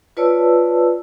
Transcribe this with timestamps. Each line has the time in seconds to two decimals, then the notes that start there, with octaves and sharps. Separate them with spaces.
0.17 F4 B4 C#5 D5 A5 E6